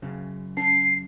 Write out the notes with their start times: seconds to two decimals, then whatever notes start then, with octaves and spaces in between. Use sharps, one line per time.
0.02 F#2 C#3
0.57 C#4 C7